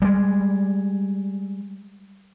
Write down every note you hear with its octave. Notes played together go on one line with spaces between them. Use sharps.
G3 G#3